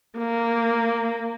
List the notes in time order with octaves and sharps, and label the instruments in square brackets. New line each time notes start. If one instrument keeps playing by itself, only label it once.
[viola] A#3